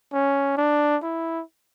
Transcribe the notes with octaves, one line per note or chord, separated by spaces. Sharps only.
C#4
D4
E4